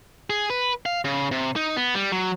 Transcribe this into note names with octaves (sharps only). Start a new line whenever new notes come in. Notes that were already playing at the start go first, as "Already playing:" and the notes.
G#4
B4
F5
C#3
C3
D#4
B3
G3
F#3